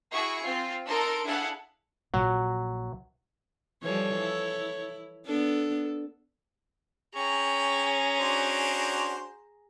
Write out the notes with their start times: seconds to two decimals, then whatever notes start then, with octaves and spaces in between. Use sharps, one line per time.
0.11 E4 F#4 G#4 C#6
0.43 C4 F4
0.87 D#4 A4 A#4 C6 D7
1.25 D4 E4 G#4 A4 F5 F#5
2.14 A#1 F#3
3.83 E3 F3 G3 A4 C#5
4.20 E4
5.27 B3 D4 A4
7.16 C#4 G#4 G5 A#5 C#6
8.19 D4 F#4 C5